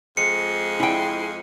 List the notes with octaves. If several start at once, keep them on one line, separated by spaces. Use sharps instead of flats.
F2 F3 G#3 C#7
E4 G5